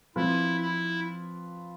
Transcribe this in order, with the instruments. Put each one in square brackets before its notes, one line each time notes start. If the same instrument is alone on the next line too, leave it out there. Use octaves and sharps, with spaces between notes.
[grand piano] F3 C4 F4 B4 [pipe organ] E4
[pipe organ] E4